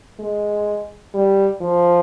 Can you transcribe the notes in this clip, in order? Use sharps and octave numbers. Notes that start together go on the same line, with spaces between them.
G#3
G3
F3